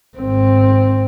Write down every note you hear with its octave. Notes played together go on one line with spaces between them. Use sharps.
G#1 C4